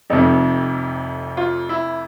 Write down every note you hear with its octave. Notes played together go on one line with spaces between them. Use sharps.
F1 F2 C3 D#4
F4
E4